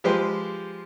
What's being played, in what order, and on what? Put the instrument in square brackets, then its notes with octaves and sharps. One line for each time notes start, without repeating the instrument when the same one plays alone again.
[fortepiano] F3 G#3 G4 B4 C5